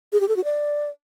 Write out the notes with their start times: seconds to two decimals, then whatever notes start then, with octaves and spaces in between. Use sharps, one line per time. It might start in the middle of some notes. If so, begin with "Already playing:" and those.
0.13 G#4
0.21 G4
0.28 A4
0.36 F#4
0.44 D5